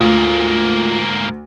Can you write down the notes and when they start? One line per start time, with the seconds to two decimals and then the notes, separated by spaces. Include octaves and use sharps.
0.01 D2 G#2 A#3 F4